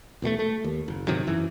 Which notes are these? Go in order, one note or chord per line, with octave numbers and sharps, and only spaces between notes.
E1 B2 G#3 A3
A3
D#2
F#1
G#2 C3 D#3 F#3
F#2 E3